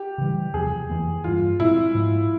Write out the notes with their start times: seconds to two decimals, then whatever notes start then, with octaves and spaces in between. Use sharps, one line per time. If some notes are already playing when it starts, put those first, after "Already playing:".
Already playing: G4
0.18 C#3 E3 G3
0.54 E2 C3 F3 G#4
0.90 F2 E3 A#3
1.24 G2 E3 A#3 F4
1.59 A#2 G#3 C4 E4
1.95 G#2 F3 G#3